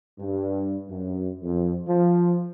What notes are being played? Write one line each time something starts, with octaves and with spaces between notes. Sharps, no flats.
G2
F#2
F2
F3